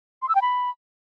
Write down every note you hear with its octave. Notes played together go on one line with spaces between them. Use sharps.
C6
E6
G5
B5